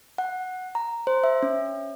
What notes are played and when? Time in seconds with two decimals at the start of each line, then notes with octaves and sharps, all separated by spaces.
0.18 F#5
0.75 A#5
1.07 C5
1.24 E5
1.43 C#4